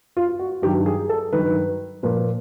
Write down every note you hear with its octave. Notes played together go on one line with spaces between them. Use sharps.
F4
F#4
G2 D#3 F#3 G4
G#4
A4
G2 D#3 F#3 B4
A#2 F3 B4